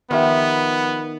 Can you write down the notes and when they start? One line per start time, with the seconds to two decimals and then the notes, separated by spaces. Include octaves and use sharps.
0.11 D#3 F3 B3 D#4 G4 E5